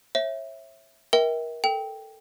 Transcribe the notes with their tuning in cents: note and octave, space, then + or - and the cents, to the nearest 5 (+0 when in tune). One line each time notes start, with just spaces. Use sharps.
C#5 -35 E5 +0
A#4 +25 E5 -35 G5 +0
A4 +0 G5 +0